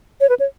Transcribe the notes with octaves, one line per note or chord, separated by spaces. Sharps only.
C#5
B4
C#5